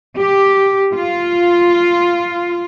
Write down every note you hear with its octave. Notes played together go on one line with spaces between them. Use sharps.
G4
F4